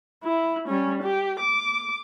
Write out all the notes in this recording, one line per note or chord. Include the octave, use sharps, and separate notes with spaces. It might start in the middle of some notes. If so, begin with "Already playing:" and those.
E4
G3 C#4
G4
D6